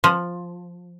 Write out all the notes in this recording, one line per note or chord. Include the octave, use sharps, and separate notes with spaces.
F3